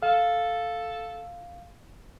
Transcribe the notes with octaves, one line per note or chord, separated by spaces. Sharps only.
A4 F5